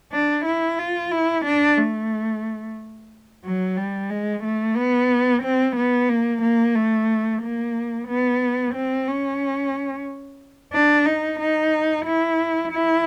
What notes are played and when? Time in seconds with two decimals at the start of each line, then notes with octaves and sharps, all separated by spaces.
0.12 D4
0.45 E4
0.78 F4
1.11 E4
1.45 D4
1.78 A3
3.44 F#3
3.77 G3
4.10 G#3
4.43 A3
4.76 B3
5.43 C4
5.76 B3
6.09 A#3
6.42 A#3
6.75 A3
7.42 A#3
8.08 B3
8.74 C4
9.07 C#4
10.73 D4
11.06 D#4
11.40 D#4
12.05 E4
12.72 E4